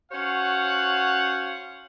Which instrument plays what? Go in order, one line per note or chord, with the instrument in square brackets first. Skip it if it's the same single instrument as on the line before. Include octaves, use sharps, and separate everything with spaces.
[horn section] C#4 F#4 C5 C#5 F5 F#5